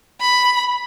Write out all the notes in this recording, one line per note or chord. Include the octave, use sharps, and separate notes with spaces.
B5